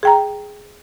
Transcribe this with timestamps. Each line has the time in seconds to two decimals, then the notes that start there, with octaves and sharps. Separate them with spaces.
0.03 G#4 G5 A#5